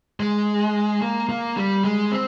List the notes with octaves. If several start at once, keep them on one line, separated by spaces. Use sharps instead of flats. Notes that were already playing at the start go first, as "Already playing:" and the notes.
G#3
A#3
A#3
G3
G#3
C4